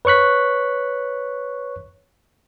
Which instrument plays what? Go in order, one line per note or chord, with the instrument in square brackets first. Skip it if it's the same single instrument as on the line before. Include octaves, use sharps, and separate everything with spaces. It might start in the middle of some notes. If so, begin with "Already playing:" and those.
[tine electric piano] B4 C#5 C#6 F#6 B6